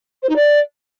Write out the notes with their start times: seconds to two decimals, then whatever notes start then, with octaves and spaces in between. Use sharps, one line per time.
0.23 C5
0.29 D#4
0.36 D5